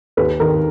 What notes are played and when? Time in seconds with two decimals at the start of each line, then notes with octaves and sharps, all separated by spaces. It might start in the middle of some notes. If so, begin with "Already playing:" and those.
0.17 D#2 B4
0.40 D#3 A#4